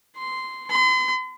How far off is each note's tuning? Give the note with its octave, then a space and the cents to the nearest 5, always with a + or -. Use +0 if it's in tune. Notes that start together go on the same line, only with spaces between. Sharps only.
C6 -10
C6 -40